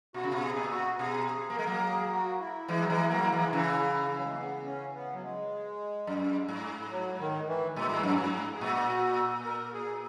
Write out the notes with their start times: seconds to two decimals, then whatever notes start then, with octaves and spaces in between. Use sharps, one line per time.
0.14 B2 F#4
0.23 C#3
0.32 B2
0.43 G#4
0.57 A#2
0.71 F#4
0.99 B2 G#4
1.28 G#4
1.50 A#3
1.56 G#3 A#4
1.66 F#3 A#3
1.84 G#4
2.12 F#4
2.40 E4
2.68 E3 G#3
2.82 F#3
2.90 E3 G#3
3.10 F#3 A#3
3.23 A#3
3.32 E3 G#3
3.47 D#3
3.53 C#3 E3
4.16 F#3
4.24 G#3
4.31 A#3
4.38 B3
4.65 C#4
4.95 B3
5.13 F#3
5.23 G#3
6.07 F#2
6.49 G#2
6.91 F#3
7.20 D#3
7.48 E3
7.76 A#2 G#3
7.89 G#2
7.99 G#3
8.03 F#2 F#3
8.16 G#2
8.55 G#4
8.61 A#2 F#4
9.45 A#4
9.73 G#4